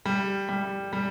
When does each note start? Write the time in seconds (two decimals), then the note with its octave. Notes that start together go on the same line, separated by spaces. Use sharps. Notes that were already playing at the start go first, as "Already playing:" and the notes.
0.06 G3
0.49 G3
0.93 G3